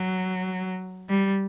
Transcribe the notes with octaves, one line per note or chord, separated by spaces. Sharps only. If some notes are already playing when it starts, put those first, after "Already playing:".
Already playing: F#3
G3